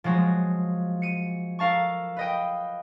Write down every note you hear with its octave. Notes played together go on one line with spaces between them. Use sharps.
F3 F#3 G#3 F#4
C#7 D#7
A4 A#4 F5 A5 C#6
B4 D#5 G5